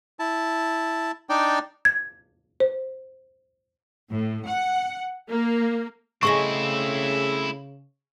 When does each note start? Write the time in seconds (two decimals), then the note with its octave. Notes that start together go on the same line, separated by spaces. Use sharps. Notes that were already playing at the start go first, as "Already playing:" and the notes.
0.19 E4 A5
1.29 D4 D#4 D5 G5
1.85 G#6
2.60 C5
4.12 A2
4.48 F#5
5.28 A#3
6.23 C#3 A3 C4 E4 G#4 D#5 C#6